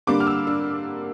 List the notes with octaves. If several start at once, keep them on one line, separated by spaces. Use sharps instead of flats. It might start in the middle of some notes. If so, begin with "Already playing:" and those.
D3 G3 A#3 D4 D6
F6
E6
D4